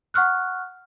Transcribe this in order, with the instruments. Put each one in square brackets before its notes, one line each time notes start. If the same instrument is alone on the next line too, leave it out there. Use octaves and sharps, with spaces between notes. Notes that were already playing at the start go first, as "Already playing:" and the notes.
[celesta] F#5 C#6 F6 F#6